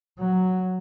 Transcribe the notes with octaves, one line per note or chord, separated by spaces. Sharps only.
F#3